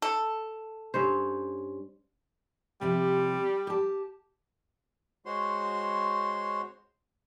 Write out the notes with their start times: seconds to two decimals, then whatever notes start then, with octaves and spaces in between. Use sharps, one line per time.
0.02 A4
0.94 G2 C#4 C5
2.81 C3 F3 G3 G4
3.67 G4 A5
5.26 G#3 F#4 C5 C#5 C6